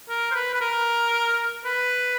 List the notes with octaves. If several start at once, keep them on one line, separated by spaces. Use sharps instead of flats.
A#4
C5
B4
B4
A#4
B4